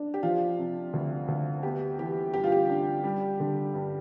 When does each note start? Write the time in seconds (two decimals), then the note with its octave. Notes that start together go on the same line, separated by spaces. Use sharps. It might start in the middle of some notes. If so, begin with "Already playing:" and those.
Already playing: D4
0.14 G4
0.23 F3 F4
0.58 C3
0.93 D2
1.28 D2
1.63 B3 G4
1.99 E3 G4
2.34 G2 G4
2.44 F4
2.52 G4
2.70 D4
3.04 G3
3.40 D3
3.74 G2